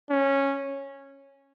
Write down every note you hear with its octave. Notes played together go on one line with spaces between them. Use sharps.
C#4